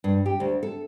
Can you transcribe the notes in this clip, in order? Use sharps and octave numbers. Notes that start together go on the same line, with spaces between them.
G2
G4
D2
A4